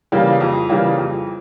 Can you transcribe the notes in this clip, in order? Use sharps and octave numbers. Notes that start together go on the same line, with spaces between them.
C#3 E3 G3 A#3
F2
C#3 E3 G3 A#3
F2